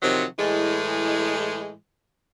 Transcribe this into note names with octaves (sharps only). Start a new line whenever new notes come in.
C3 D#3 F3 F#3
A2 E3 G#3